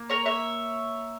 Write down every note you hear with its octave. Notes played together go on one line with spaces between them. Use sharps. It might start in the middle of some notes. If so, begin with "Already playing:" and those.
Already playing: A#3
A#4 C#5
C#5 E5